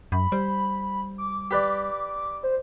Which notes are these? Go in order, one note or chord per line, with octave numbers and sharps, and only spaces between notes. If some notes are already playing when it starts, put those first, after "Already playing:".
F#2 B5
G3 C5
D6
G4 B4 D5
C5